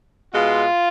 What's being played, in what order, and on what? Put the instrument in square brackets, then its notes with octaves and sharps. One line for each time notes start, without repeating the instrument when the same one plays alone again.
[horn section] B2 G#3 F4